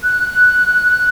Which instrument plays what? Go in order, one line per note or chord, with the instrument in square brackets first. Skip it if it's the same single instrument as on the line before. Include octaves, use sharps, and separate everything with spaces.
[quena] F#6